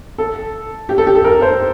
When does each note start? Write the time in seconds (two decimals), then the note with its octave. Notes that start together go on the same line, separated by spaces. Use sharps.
0.18 A4
0.89 G4
0.98 A4
1.07 G4
1.15 A4
1.24 A#4
1.42 C5